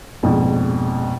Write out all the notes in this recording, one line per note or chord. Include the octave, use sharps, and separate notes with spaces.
A#1 F2 G#2 B2